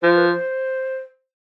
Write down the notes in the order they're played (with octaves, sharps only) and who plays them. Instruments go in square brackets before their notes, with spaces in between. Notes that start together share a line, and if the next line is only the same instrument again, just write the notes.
[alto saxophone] F3 [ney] C5
[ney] B4
C5